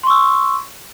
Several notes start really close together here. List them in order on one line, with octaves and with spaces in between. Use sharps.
C6 C#6 E6